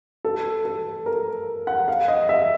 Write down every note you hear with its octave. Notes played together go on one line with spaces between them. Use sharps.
A4
A4
A#4
F#5
F5
D#5
E5